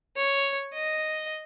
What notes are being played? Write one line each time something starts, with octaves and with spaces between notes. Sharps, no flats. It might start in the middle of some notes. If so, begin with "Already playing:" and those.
C#5
D#5